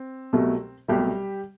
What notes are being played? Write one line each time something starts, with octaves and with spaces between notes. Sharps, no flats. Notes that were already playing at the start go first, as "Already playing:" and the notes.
Already playing: C4
C2 B2 F#3 A3
C2 B2 F#3 G3 A3 G4